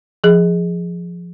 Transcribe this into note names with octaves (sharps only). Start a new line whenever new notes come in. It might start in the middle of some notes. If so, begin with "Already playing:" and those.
F3 G#4